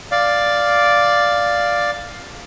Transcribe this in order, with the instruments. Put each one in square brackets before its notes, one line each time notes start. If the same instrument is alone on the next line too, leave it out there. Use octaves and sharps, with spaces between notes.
[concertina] D5 F5